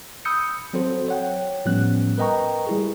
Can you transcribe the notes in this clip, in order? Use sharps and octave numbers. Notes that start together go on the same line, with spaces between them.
B5 D#6 E6 G6 C#7
F#3 C4 F#4 A4 C5
C#5 F#5 G5
A2 F3 G3 B3 C#4 F#6
A#4 B4 D#5 G5 A#5 C#6
G3 E4 G#4